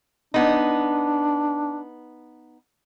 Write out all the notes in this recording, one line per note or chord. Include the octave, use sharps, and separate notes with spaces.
B3 D4 D#4